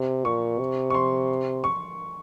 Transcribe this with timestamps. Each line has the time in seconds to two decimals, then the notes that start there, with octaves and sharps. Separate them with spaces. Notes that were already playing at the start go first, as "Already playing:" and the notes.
Already playing: C3
0.25 A#2 C#6
0.59 C3
0.90 C#6
0.94 C6
1.64 C#6